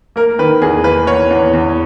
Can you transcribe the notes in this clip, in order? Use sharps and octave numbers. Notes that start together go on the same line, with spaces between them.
A#3 A#4
D#3 B4
E2 G#4
A#3 B4
E2 C#5
E2
E2